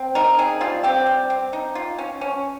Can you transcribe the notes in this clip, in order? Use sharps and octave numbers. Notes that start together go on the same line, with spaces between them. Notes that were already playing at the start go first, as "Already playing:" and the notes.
Already playing: C4
D#4 A#4
C4 G#4
G3 F4
C4 G4
G3
C4
D#4
F4
C#4
C#4